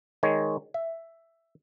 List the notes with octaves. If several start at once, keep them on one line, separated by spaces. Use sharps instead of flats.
D#3 G#3 C#5
E5